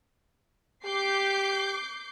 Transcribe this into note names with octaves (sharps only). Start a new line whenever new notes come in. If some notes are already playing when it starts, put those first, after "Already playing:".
G4 D6 G6 C7